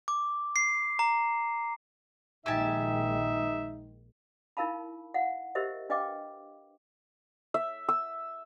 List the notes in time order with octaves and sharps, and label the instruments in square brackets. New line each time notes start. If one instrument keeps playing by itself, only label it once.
[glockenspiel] D6
C7
A#5
[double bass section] A#1 D#3 G#3 [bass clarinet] D#4 [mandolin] G4 G#5 A5 [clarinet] E5
[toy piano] D#4 E4 A#4 F5 A5 B5
F5 F#5
G4 A#4 C5 D#5 E5
D4 B4 D#5 F5 G5 D6
[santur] E5
E6